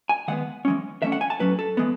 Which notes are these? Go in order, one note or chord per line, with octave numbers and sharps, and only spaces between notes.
G#5
D#3 G#3 B3 F#5
E3 G#3 C#4
E3 A3 C#4 E5
F#5
G#5
A5
A2 F#3 C#4 B4
A4
E3 G#3 B3